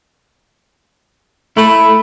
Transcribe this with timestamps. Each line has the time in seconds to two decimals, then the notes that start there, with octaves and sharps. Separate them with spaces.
1.57 A3 E4 B5